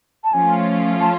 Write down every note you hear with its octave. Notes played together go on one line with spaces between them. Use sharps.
A5
F3 A3 C#4 F4 G#5
A5